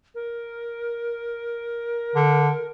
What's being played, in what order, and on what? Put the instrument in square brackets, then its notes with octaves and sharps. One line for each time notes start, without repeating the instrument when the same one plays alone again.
[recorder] A#4
[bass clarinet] D3